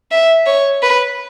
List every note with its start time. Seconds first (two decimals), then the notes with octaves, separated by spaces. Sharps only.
0.12 E5
0.47 C#5
0.83 B4